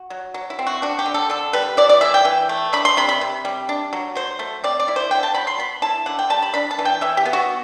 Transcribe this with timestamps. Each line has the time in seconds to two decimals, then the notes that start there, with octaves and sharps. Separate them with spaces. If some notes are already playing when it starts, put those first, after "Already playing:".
Already playing: F#4
0.10 F#3
0.34 F#3
0.50 E4
0.59 C4
0.67 F#4
0.82 D4 F#4
0.99 G4
1.06 D3
1.14 A4
1.30 D3 A4
1.53 G3 B4
1.77 E4 D5
1.89 D5
2.01 E3 E5
2.14 G5
2.25 E3
2.49 A3
2.73 D4 B5
2.85 C6
2.97 C3 B5
3.09 B5
3.21 C3
3.45 G3
3.69 D4
3.93 F#3
4.15 F#3 C5
4.39 A3
4.64 C4 D5
4.80 D5
4.88 E4
4.96 C5
5.11 D3 G5
5.23 A5
5.35 F#3 B5
5.47 C6
5.58 B3 B5
5.82 E4 A5
6.06 D3 F#5
6.19 G5
6.30 G3 A5
6.42 B5
6.54 D4 B5
6.71 A5
6.79 E3
6.85 G5
7.01 E3 E5
7.17 G4
7.25 B3
7.33 F#4